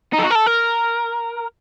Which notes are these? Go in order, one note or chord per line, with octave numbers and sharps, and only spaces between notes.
D#4
A4
F#4
A#4
A4
A#4